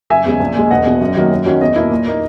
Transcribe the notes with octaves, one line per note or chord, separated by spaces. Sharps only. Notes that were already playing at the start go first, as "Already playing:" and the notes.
F#1 E5 G#5
E2 C#3 G#3
A#1
A#2 G#3
E1 D#5 F#5
E2 B2
F#2
D#3 F#3 A#3
F#2
D#3 F#3 C#4
E2 D#5
B2 A#3 E4
A#2
A#3 D#4